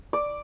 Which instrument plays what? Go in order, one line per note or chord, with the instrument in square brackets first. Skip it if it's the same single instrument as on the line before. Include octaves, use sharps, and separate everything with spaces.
[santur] D5